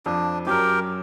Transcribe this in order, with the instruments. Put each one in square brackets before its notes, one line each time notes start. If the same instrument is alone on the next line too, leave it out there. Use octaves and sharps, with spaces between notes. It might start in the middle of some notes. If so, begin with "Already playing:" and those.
[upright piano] F2 F3 [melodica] D4
[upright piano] F#2 F#3 [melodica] G4 A#4